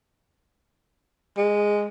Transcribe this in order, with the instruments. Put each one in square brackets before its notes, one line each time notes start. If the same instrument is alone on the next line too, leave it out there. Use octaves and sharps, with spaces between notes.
[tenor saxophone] G#3